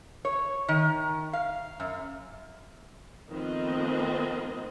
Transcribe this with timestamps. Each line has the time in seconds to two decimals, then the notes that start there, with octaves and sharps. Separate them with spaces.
0.25 C#5
0.68 D#3
1.33 F5
1.80 F#2
3.29 D#3 F3 A3 B3 C4 D#5